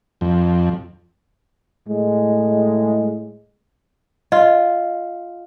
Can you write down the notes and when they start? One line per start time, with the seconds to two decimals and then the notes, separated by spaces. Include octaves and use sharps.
0.21 F2
1.89 A2 G#3
4.32 F4 D#5